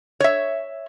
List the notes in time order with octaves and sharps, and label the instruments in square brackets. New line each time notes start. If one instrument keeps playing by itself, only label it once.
[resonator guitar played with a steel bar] C#5 E5